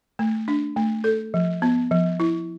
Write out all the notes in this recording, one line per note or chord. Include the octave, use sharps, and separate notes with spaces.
A3
D4
A3
A4
F3
B3
F3
E4